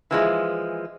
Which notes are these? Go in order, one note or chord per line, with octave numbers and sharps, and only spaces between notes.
E3 F3 G#3